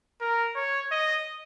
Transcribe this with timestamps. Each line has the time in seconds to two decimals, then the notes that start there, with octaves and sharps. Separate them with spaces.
0.21 A#4
0.56 C#5
0.91 D#5